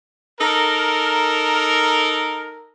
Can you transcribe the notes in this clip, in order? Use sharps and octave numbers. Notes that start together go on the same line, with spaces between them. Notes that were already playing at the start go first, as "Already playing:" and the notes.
D#4 A4 A#4